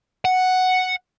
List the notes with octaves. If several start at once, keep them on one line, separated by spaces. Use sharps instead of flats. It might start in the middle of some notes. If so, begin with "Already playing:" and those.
F#5